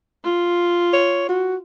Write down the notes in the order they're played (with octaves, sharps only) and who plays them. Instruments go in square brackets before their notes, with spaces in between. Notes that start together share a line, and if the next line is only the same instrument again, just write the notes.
[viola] F4
[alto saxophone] C#5
F#4